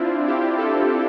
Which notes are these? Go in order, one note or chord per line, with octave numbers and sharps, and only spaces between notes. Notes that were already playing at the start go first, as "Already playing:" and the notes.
Already playing: C4 D4 E4 F4
E4 G4
F4 A4